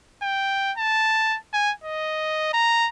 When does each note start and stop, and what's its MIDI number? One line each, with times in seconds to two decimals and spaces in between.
0.22 0.73 79
0.78 1.38 81
1.53 1.72 80
1.84 2.50 75
2.53 2.89 82